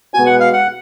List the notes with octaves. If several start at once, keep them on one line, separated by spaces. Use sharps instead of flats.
B2 G#3 B3 F#4 G#5
F#5
F5
F#5